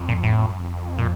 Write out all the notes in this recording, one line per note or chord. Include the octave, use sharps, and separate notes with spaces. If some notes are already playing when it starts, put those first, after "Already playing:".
Already playing: F2
A#2
A2
F2
F#2
F2
A#2